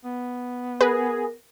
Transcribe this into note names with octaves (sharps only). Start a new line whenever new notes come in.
B3
G#4 A#4 B4